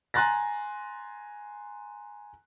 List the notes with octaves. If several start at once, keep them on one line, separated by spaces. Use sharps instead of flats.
G#5 A#5 C6 F#6 A6 A#6